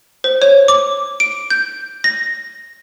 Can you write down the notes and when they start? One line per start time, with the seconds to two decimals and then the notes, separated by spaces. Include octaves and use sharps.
0.24 C5
0.42 C#5
0.68 D6
1.20 D7
1.50 G6
2.04 A#6